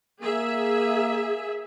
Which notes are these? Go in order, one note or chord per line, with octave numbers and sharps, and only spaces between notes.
A#3 G#4 E5